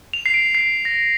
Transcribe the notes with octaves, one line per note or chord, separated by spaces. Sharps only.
F7
C7
D7
C7
A#6